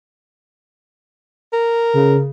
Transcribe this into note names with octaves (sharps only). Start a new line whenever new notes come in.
A#4
C#3